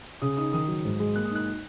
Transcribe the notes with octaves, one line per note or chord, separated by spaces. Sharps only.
C#3 D#6
D#4 D#6
D#3 D#6
F#3
G#2
G#3
A#3 F#6
D#6
D#4 F#6